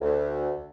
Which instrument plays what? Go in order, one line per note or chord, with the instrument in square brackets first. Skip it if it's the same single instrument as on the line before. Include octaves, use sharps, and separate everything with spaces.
[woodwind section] D2